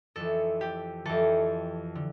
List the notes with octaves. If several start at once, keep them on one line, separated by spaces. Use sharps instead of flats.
F2 E3 A4
G4
F2 E3 A4
D3